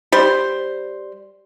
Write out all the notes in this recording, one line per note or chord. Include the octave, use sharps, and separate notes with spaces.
G3 C5